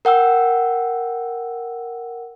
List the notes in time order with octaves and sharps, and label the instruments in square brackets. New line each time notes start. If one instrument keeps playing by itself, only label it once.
[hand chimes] A#4 F#5 G5 E6